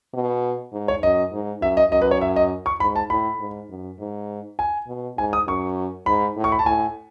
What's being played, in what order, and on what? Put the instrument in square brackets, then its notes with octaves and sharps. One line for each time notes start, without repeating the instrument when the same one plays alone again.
[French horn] B2
G#2
[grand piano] C#5
[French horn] F#2 [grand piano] D#5
[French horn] G#2
[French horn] F#2 [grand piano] E5
[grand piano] D#5
[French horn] F#2 [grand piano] D#5
[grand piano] B4
C#5
E5
D#5
C#6
[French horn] G#2 [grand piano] B5
[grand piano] A5
[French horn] A2 [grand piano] B5
[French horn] G#2
F#2
G#2
[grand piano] G#5
[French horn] B2
[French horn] G#2 [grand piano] G#5
[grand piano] D#6
[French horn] F#2 [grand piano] C#6
[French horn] G#2 [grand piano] B5
[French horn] A2
[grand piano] C#6
B5
A5
[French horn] A2 [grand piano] G#5